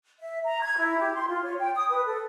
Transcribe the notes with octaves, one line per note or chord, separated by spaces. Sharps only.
E5
A#5
G#6
E4
G4
C6
F4
C#5
G5
D#6
B4
A4